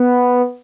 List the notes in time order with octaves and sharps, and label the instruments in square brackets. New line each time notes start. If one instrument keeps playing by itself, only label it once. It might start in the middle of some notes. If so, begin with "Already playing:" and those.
Already playing: [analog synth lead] B3